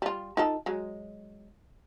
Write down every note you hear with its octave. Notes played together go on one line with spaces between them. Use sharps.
G3 F4
D#4 F4 A4
F#3 G#3